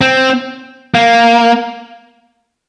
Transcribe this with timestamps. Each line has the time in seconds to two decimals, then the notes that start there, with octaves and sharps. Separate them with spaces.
0.01 C4
0.95 A#3